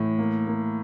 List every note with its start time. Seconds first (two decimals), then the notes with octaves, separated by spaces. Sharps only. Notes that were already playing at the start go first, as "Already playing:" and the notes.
Already playing: A2 E3
0.19 A#3
0.47 A#3